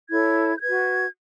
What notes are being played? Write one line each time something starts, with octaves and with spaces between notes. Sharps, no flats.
E4 A4 C#5 G#6
G6
F#4 B4 G#6